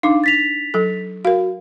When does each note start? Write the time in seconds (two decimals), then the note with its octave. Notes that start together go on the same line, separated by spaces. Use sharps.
0.03 D4 D#4 F5 D6
0.24 A6 B6 F7
0.74 F#3 A4
1.25 F#4 A#4 F5